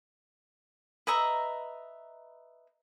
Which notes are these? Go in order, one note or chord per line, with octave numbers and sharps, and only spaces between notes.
B4 D#5 E5 A#5